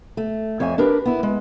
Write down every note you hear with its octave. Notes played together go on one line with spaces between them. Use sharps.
A3
F2 C#5 E5 G#5
D4 G4 A#4 B4
B3 E4
G#3